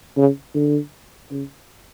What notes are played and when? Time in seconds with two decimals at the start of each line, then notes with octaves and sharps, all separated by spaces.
0.17 C#3
0.55 D3
1.31 C#3